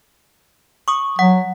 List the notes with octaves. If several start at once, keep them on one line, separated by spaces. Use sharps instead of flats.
C#6 D#6
F#3 F#5